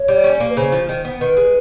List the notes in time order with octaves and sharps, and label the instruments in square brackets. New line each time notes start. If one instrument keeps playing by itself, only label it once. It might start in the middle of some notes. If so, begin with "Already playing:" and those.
Already playing: [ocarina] C#5
[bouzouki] G3
C#4
A#3
[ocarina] B4
[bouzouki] C#3 [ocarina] C5
[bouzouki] F3
D#3
B3
[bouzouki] D#3 [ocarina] B4
[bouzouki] G#3